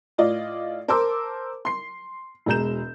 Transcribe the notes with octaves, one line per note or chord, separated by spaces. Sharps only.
A2 F4 D5 D#5
A#4 C5 A5 C6 D6 E6
C6 C7
E1 B2 G#3 A#5 G6 E7